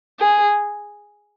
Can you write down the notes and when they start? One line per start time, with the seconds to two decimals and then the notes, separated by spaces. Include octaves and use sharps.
0.19 G#4